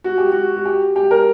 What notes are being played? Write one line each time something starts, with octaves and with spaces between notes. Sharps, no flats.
F#4
G4
F#4
F#4
G4
G4
A#4